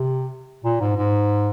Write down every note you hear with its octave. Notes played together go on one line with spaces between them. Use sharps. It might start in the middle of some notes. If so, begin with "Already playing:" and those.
Already playing: C3
A#2
G#2
G#2